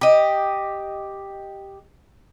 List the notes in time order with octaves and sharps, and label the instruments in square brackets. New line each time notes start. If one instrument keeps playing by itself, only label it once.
[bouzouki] G4 D#5